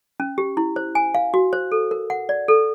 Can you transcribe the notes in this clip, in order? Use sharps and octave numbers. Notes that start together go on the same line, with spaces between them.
C#4
G4
E4
C5
G#5
F5
F#4
C5
A4
A#4
F#5
D5
A4